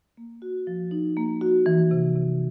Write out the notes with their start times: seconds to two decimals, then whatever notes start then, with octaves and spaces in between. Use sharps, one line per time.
0.17 A#3
0.42 F#4
0.67 F3
0.91 D#4
1.17 A#3
1.41 F#4
1.66 E3
1.91 C3
2.15 C3